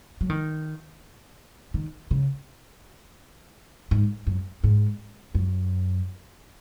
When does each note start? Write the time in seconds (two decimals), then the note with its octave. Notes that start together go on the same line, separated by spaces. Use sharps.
0.21 F#3
0.30 D#3
1.74 D#3
2.11 C#3
3.91 G#2
4.27 F#2
4.64 G#2
5.35 F#2